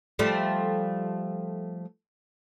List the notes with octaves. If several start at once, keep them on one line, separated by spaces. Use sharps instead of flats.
F3 G3 A3